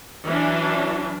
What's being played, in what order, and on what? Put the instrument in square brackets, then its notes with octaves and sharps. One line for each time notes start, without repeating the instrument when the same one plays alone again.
[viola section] E3 F#3 C#4 D4